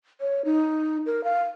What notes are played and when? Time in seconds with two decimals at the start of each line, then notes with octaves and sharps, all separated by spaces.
0.21 C#5
0.45 D#4
1.06 A#4
1.24 F5